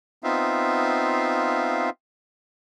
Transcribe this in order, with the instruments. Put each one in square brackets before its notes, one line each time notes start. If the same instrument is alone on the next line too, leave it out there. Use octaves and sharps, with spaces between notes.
[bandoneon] B3 C4 D#4 F4 E5 F5